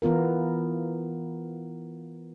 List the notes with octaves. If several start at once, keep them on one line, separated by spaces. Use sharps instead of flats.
E3 B3 F4 A#4